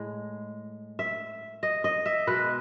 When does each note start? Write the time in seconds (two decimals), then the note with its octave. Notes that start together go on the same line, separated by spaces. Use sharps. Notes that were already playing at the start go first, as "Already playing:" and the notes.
Already playing: A2 G#3
0.99 E5
1.63 D#5
1.84 D#5
2.06 E5
2.27 B2 G#3 B4